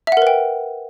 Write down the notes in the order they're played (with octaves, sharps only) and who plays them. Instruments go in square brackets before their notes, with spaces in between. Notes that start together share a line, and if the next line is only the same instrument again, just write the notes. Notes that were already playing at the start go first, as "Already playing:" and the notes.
[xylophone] E5
F#5
A#4
B4
G5